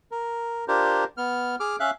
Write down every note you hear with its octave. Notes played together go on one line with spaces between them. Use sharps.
A#4
D4 F4 G4 A#4 C5
B3 F6
G#4 D6 F6
C#4 E5 F5 F#6